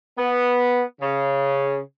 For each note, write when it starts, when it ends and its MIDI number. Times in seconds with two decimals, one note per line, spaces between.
0.18 0.82 59
1.01 1.78 49